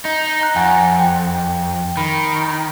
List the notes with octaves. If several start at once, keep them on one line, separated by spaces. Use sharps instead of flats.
D#4
A#5 F#6
F2 F#5 G#5
G5
D#3 B5